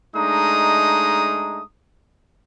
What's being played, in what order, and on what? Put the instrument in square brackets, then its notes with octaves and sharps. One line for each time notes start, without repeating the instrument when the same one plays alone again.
[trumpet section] G#3 A3 D4 D#4 A#5 D#6